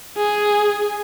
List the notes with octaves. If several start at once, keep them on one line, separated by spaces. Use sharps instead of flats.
G#4